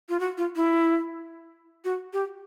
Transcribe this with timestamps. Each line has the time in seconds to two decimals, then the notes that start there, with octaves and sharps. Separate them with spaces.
0.09 F4
0.20 F#4
0.38 F4
0.56 E4
1.85 F#4
2.13 G4